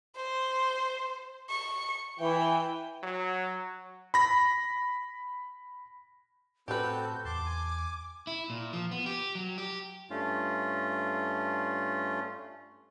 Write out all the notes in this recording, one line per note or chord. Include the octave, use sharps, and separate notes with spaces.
C5
C#6
E3 G5
F#3
B5 A#6
A2 C4 F#4 G4 A4 B4 G6
E2 A5 C6 D6
G#5
E4
A#2
F3
B3
G4
F#3
G4
G2 A3 C#4 F4